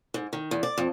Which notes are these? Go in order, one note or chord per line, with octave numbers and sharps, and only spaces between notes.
G#2
D#3
E2
D5
F2